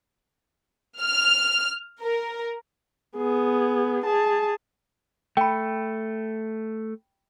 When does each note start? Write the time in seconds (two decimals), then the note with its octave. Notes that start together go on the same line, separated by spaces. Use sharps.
1.01 F6
2.02 A#4
3.17 B3 G#4
4.05 G#4 A5
5.37 A3 G5 B5